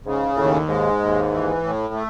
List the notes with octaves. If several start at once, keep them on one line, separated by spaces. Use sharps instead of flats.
G#2 C#3
D#2 A2
G#2 G#3
D#2
E3
A2
A3